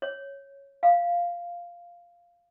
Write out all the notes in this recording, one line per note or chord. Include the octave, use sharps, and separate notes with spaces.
C#5
F5